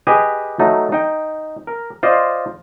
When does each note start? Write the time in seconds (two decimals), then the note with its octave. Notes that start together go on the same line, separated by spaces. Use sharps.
0.07 G4 G#4 B4 D#5 G#5
0.59 F#3 A3 D#4
0.92 D#4 G5
1.67 A#4
2.03 F4 C5 D5 D#5